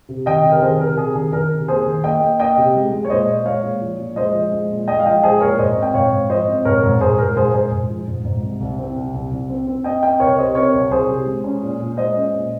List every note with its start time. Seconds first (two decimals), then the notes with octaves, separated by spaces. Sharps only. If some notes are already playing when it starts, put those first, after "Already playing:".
0.09 C3
0.26 D#3 D#5 G5
0.43 C3
0.52 A#4
0.62 D#3 G#4 C5
0.80 C3 A#4
0.97 C3 G#4
1.15 D#3 G#4
1.33 D#3 A#4
1.51 C3
1.68 A#3 G#4 C5
1.86 D#3
2.04 A#3 D#5 G5
2.22 A#3
2.39 A#3 D#5 G5
2.57 C3
2.75 G#3
2.93 G#3
3.05 C#5
3.10 A#2 C5 D#5
3.29 A#2
3.46 G#3 C#5 F5
3.63 A#2
3.81 F3
3.99 A#2
4.16 G#3 C5 D#5
4.34 F3
4.52 G#3
4.70 A#2
4.88 G#3 D#5 G5
5.00 F5
5.05 F3 D#5 G5
5.23 G#3 G#4 C5
5.41 A#2 A#4 C#5
5.59 G#2 C5 D#5
5.76 C4
5.83 G5
5.94 G#2 C#5 F5
6.12 G#2
6.29 F3 C5 D#5
6.47 C4
6.65 G#2 A#4 C#5
6.83 G#2
7.01 G#2 G#4 C5
7.18 G#2 A#4
7.36 G#2 G#4 C5
7.54 G#2 G#4 C5
7.71 G#2
7.90 F3
8.08 G#2
8.25 G#2
8.43 C2
8.61 C2
8.79 C4
8.96 C2
9.14 C2
9.31 C2
9.49 C4
9.67 C4
9.84 C4 D#5 G5
10.02 C4 D#5 G5
10.20 C2 A#4 C#5
10.38 C3 C5 D#5
10.55 C4 A#4 C#5
10.73 C2
10.91 C2 G#4 C5
11.09 C3
11.26 G#3
11.44 C#4
11.62 A#2
11.80 A#2
11.97 G#3 C5 D#5
12.16 C#4
12.33 A#2